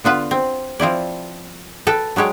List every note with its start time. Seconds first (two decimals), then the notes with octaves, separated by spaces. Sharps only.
0.04 D3 B3 F4 B4
0.31 C4
0.80 F3 C4 E4 D5
1.87 A4 B4 G5
2.16 F#3 G#3 G4 C#5